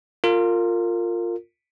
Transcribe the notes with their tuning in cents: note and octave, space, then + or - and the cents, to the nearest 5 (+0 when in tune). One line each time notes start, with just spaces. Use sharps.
F4 +5 A#4 -30